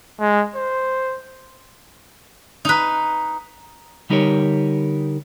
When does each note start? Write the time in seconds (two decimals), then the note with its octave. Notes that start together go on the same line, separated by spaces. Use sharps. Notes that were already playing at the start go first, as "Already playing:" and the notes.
0.20 G#3
0.56 C5
2.65 D#4 B4
4.10 D3 G3 D#4 G4 A#4 C#5